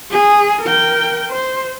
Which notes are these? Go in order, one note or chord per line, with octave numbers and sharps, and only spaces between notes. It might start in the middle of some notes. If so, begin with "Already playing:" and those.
G#4
A#4 G5
C5